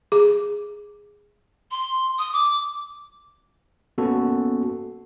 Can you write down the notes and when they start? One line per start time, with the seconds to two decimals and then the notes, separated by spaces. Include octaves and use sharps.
0.12 G#4
1.71 C6
2.19 D#6
2.33 D6
3.98 A#3 B3 C#4 F#4 A4